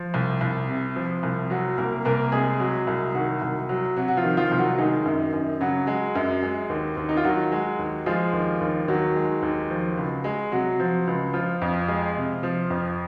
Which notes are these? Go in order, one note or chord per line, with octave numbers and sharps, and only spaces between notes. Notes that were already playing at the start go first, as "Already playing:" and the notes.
Already playing: F3
C2
C2
C3
F3
C2
F#3 F#4
C2 A#3 A#4
C2 A#3 A#4
C3 G#3 G#4
F#3
C2
D#3 F#3 F#4
C2
F#3
C3 F#3 F#4
F#4
F3 F4
D#3
F3 F4
C2
F#3 F#4
D#3 G#3 D#4
F#2
F#2
C#3 F#3 F#4
G#3
F#2
G#3
D#2
D#2
D#4
F4
D#3 F#3 F#4
G#3
D#2
F3 G#3 F4
D#2
D#2
D#3 F#3 F#4
G#3
D#2
F3
C#2
G#3
C3 F#3 F#4
F3
C#2
F3 F4
F2
G#3
C3
F3
F2